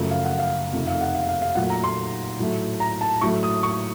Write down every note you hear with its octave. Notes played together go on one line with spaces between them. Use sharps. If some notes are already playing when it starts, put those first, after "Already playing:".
Already playing: F#2 C#3 F3 A3
F5
F#5
F5
F2 C3 D#3 A3
F5
F#5
F5
F5
F5
A#2 F#3 A3 F#5
A#5
C6
A2 F#3 A3
A#5
A5
A2 F#3 A3 C#6
D#6
C#6